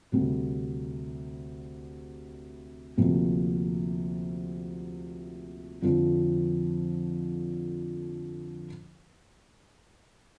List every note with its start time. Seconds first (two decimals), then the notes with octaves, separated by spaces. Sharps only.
0.12 D2 C3 G3
2.98 D2 C3 F3 A#3
5.82 F2 D3 F3 C4